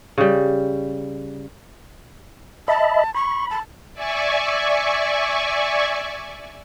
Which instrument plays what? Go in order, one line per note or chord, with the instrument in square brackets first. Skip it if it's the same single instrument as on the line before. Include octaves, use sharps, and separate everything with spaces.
[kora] C#3 G3
[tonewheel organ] D#5 E5 B5 [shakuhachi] A5
[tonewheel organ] B5 [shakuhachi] C#6
[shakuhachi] A5
[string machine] D5 E5 G#5 C#6